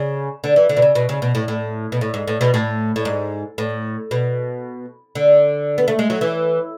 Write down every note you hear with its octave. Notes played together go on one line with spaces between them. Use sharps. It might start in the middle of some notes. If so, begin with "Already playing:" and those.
Already playing: C#3
D3
E3
D3
B2
C#3
B2
C#3
B2
A2
A2
B2
A2
G#2
A2
B2
A2
A2
G#2
A2
B2
D3
B3
A3
G#3
F#3
E3